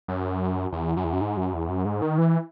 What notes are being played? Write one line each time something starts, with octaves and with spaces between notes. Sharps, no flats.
F#2
E2
F#2
E2
F#2
G#2
F#2
E2
F#2
G#2
D#3
E3